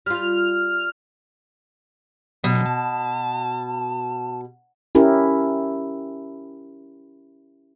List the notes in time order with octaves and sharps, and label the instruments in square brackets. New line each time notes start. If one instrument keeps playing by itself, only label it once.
[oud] G3 F4 [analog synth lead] F6
[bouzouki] B2 [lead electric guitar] D3 F#3
[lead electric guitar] A5
[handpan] C#4 E4 G4 A#4